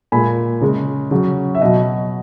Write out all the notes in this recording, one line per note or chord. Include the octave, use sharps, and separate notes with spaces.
A#2 G#3 G#5 B5
C#3 G#3
C#3 F#3
E5
B2 F#3 D#5